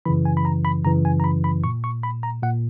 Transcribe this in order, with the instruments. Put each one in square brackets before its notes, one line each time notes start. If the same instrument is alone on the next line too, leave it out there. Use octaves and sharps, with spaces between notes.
[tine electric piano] F#2 C#3 E3 B5
G#5
B5
A#5
B5
F#2 C#3 E3 A#5
G#5
A#5
B5
B5
A#2 C#6
C#6
B5
A#5
A#2 F#5